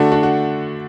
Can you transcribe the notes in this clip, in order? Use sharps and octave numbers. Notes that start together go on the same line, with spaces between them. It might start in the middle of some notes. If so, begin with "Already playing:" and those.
Already playing: D3 A3 D4 F#4
D4 F#4
F#4